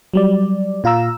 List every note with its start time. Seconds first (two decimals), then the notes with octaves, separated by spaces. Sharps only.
0.14 F#3 G3 D5
0.84 A#2 F4 F5 A#5 E6